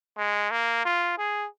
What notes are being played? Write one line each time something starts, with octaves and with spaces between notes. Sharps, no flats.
G#3
A#3
F4
G#4